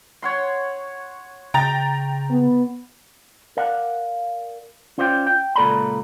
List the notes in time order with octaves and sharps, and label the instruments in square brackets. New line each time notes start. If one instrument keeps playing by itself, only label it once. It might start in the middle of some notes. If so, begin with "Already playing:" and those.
[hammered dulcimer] C#5 F#5 C6
[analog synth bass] C#3 [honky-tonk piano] G5 A#5 A6
[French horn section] B3
[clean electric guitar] A#4 D5 F5 F#5
C#4 F4 C5 D5 E5 G5
G5
C#2 A#2 A4 D5 A#5 B5